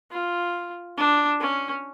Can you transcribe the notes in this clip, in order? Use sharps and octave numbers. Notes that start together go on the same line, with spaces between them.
F4
D4
C#4